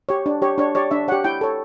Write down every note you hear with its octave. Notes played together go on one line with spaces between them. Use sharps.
G4 C#5
D4
G4 C#5
D4 C#5
G4 C#5 D5
D4 E5
G4 C#5 F#5
E4 G5
A4 C#5